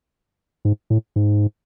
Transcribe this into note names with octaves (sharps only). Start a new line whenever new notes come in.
G#2
A2
G#2